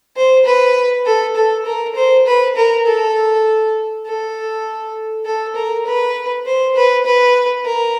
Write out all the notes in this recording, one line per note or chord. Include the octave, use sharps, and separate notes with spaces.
C5
B4
A4
A4
A#4
C5
B4
A#4
A4
A4
A4
A#4
B4
C5
B4
B4
A#4